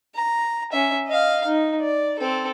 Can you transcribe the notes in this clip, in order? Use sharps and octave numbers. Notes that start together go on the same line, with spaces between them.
A#5
C#4 E5
D#5 F5
D#4
D5
C4 A4